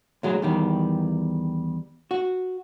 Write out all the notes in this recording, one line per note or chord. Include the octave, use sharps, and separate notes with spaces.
D2 F#3 G#3
E2 D#3 G3
F#4